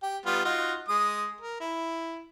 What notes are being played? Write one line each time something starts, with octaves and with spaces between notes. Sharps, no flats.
G4
G3 B3 F4
D#4 F4 F#4
G#3 D#6
A#4
E4